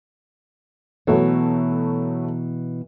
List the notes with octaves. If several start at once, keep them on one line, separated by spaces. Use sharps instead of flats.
B2 E3 F#3 A3 B3